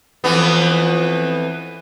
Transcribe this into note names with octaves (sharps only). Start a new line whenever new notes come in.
F2 E3 B3